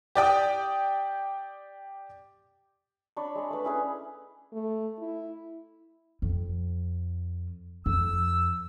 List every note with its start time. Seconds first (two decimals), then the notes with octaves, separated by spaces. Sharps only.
0.15 G4 D5 G5 D#6
3.17 D4 C#5 B5
3.35 G#3 B5
3.50 A3 B4
3.64 C#4 E4 G#4 B4
4.53 A3
5.00 E4
6.22 F2
7.86 F2 E6